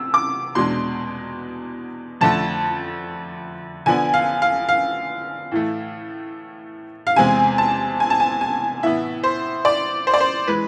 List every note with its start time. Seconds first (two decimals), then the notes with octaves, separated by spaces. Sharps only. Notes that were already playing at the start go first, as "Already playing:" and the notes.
Already playing: C3 E6
0.14 D6
0.55 E2 B2 G#3 D4 C6
2.21 F2 D3 A3 A5
3.86 D3 F3 B3 D4 G#5
4.14 F5
4.42 F5
4.69 F5
5.52 A2 E3 A3
7.07 F5
7.16 E2 C3 G#3 C4 G#5
7.58 A5
8.00 G#5
8.10 A5
8.20 G#5
8.41 G#5
8.83 A2 E3 B3 E5
9.24 C5
9.65 D5
10.07 C5
10.14 D5
10.20 C5
10.47 E3 G#3 B4